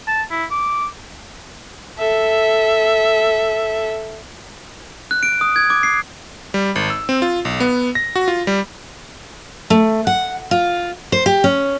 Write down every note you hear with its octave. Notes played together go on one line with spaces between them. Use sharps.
A5
E4
D6
A4 E5
F#6
D7
D#6
G#6
D6
C7
G3
G#1
E6
C4
F4
B1
B3
A#6
F#4
F4
G3
A3
F#5
F4
C5
G4
C#4